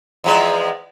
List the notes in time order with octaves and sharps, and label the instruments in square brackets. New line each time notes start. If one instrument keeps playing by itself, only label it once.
[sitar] E2 F3 G#3